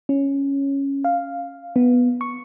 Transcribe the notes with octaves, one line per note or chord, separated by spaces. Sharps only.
C#4
F5
B3
C#6